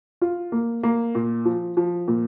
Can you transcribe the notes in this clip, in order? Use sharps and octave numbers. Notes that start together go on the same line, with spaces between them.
F4
A#3
A#3
A#2
F3
F3
A#2